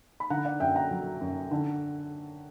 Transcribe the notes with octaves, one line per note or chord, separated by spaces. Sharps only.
B5
D3 F#5 A#5
D5 F#5
F#2 E5 G5
F#5 A#5
F#3
F#2
D3